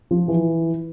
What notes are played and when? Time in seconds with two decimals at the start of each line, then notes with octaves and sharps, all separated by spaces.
0.11 F3
0.28 E3